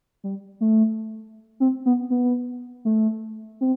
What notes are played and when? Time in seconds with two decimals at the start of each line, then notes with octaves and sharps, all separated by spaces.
0.24 G3
0.61 A3
1.60 C4
1.86 B3
2.10 B3
2.85 A3
3.61 C4